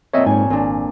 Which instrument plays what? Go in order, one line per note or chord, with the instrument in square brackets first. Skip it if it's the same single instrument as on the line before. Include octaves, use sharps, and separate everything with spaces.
[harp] F2 A#2 [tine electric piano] C#5 D#5 E5
[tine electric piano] G#2 [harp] C#5 G#5
[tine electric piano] G#1 [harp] A#2 D4